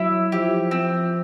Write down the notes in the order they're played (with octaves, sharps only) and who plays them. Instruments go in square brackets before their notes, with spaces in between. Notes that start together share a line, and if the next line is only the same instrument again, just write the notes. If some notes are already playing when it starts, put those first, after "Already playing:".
Already playing: [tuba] F#3 [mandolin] E4 E5
[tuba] F3 [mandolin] G4
[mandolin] C4